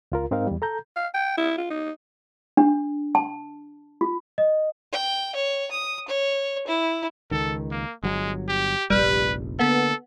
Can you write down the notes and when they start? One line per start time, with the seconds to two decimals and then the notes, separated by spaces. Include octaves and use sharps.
0.12 C#2 F4 A#4
0.31 G#2 C4 D#4 A#4 F5
0.47 E2 G3
0.62 A4 A#5 G6
0.96 F5
1.14 G5
1.37 E4
1.58 F4
1.70 D#4
2.57 D4
3.15 A5
4.01 F4
4.38 D#5
4.92 G5
5.35 C#5
5.71 D#6
6.08 C#5
6.67 E4
7.31 C#2 D#3 A4
7.71 A#3
8.03 G1 F#3 G#3
8.48 G4
8.90 F1 A#1 G3 B4
9.59 D3 A#3 B3 A4